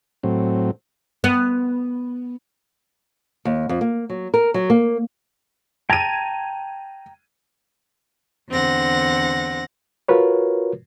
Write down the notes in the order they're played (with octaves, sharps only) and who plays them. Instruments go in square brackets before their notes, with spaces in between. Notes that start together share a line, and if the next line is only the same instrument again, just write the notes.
[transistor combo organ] A2 F#3 C4
[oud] B3
[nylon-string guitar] D#2
F2
A#3
F#3
A#4
F#3
A#3
[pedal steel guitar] G5 A5 A#5 [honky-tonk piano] G#6 D#7
[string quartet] E2 D3 C4 F#5 A#6
[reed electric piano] F4 F#4 A#4 B4 C#5